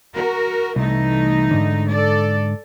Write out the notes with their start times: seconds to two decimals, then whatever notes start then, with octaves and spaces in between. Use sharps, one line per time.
0.14 F#4 A#4
0.76 C2 E3 A3 D#4
1.51 G#2 D3
1.87 A4 D5